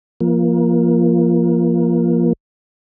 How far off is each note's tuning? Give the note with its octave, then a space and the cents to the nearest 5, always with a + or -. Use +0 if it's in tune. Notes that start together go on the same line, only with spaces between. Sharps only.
F3 -20 A#3 +20